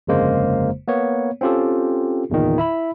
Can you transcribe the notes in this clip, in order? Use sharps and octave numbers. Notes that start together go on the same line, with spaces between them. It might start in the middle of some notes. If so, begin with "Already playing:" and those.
G1 F2 C#3 G#3 A#3 C5
A#3 B3 C#5
C4 C#4 F4 G4 A4
G1 E2 A#2 D#3
E4 E5 B5